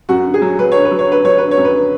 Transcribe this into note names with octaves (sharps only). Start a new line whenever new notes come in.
F#2 F#4
D3
G#4
F#3
F#3 B4
D3 C#5
B4
F#3
C#5
D3 B4
F#3 C#5
D3 B4
C#5
F#2
B4
D3